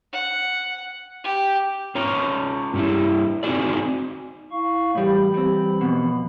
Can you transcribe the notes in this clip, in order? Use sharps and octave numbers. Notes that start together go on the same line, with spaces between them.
F#5
G4
C#4 F4 C#5 A#5
G2 G3 E4
C4 D#4 F4 F#4 G#4 D5
E4 F5 C#6
A2 E3 G3 B5
G3 C4
F2 B2